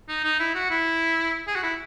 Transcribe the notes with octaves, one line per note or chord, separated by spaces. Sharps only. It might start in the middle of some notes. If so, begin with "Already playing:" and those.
D#4
D#4
E4
F#4
E4
G#4
F#4
E4